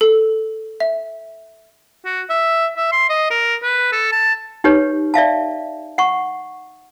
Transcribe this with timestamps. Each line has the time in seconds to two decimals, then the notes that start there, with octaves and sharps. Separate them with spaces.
0.01 A4
0.80 E5
2.05 F#4
2.30 E5
2.77 E5
2.92 C6
3.10 D#5
3.31 A#4
3.63 B4
3.92 A4
4.12 A5
4.64 D#4 G4 B4 C#5
5.14 D5 E5 F5 A5
5.98 F#5 C#6